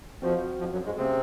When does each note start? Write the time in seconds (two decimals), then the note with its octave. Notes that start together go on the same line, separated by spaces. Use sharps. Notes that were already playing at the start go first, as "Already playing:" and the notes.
0.22 F2 F3 C4 F#4 C5
0.59 F2 F3
0.72 F#2 F#3
0.85 G#2 G#3
0.97 C3 A#3 C4 C#4 G#4